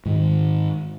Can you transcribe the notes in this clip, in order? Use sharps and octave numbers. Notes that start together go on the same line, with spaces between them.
G#2 D#3